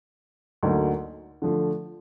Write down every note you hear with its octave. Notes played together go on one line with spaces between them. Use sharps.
D2 D3 F#3 A#3 D#4
D3 F3 A3